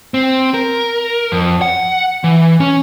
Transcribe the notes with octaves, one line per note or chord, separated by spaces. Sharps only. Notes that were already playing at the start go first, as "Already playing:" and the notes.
C4
A#4
F2
F#5
E3
C#4